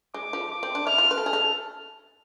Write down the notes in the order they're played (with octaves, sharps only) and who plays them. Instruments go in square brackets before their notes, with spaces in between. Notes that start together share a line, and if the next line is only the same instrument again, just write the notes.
[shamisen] G#3 [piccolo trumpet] D6
[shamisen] F3
[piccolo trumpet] D6
[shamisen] C4
D4
[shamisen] E4 [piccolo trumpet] F6
[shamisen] F4
B4
A4
G#4
A4